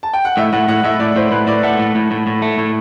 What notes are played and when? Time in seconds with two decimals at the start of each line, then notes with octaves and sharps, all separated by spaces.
0.03 A5
0.13 G5
0.25 F#5
0.37 A2 E5
0.53 A2 F#5
0.68 A2 F#5
0.84 A2 E5
0.99 A2 D5
1.16 A2 C5
1.31 A2 B4
1.47 A2 D5
1.63 A3 F#5
1.79 A2
1.95 A2
2.11 A2
2.27 A2
2.42 A3
2.58 A2